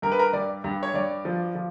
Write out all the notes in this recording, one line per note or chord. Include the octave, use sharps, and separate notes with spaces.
G2 A#4
B4
A#4
G2 D5
G2
C#5
G2 D5
F3
F3